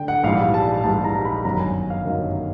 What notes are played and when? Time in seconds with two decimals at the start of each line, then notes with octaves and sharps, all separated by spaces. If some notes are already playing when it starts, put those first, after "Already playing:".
Already playing: D3 G5
0.08 F#5
0.24 A#1 G#2 E3 G3 F5
0.54 A5
0.84 A#1 G#2 E3 G3 A5
1.04 A#5
1.25 B5
1.44 G1 F#2 D#3 F#3 A#5
1.60 G#5
1.90 F5
2.05 G1 F#2 D#3 F#3